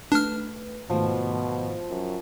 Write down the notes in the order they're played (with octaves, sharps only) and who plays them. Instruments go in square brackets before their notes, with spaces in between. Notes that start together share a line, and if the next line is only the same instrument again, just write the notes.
[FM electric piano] A3 B4 [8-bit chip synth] D4 F6
[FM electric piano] G#2 D#3 A3 [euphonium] B2 [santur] F3
[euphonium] F#2